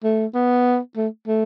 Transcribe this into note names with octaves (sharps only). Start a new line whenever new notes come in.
A3
B3
A3
A3